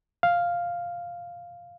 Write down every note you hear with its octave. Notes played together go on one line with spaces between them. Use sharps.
F5